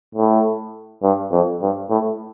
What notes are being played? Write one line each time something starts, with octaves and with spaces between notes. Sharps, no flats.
A2
G2
F2
G2
A2